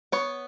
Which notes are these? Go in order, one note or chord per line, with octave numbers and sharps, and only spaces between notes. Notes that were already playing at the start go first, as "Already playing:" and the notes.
B3 C#5